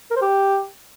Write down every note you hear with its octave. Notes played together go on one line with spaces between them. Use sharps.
A#4
C5
G4